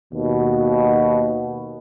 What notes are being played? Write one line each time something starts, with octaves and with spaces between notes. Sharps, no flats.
D#2 B2